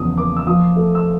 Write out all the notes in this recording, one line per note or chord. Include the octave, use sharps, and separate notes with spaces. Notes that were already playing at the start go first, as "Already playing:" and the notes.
Already playing: E2 C#3 F3 D#6
A#3 D6
E6
F3 D#6
A3
E6